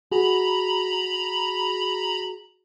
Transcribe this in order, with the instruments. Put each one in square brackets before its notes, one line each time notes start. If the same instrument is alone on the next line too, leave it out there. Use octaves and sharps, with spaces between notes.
[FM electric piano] F#4 G#4 [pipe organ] A#5 B5